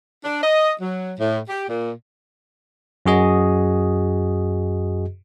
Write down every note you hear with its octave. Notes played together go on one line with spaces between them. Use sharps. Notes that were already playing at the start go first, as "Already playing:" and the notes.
D4
D#5
F#3
A2
G4
A#2
F#2 F#4 G#4 D#5